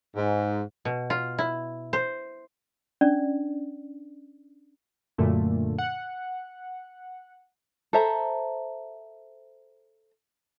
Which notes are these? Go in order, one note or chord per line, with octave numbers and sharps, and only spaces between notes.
G#2
B2
F4
E4
C5
C#4 D4 D5
F#2 A#2 D3 A3
F#5
A4 C5 E5 A#5